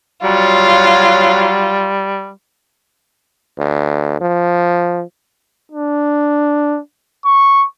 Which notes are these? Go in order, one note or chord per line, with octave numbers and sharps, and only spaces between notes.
F#3 G3 F4
D2
F3
D4
C#6